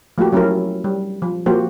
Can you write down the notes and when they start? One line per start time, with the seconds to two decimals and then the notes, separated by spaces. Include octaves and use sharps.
0.18 F3 A3 A#3 F#4 G4
0.32 F#3 C#4 E4 A#4
0.84 G3
1.22 F3
1.46 F3 A#3 F#4 G4 C5